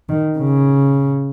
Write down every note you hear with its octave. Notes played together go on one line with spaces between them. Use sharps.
D#3
C#3